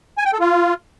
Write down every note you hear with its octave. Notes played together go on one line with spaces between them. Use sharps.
G#5
G5
A4
F4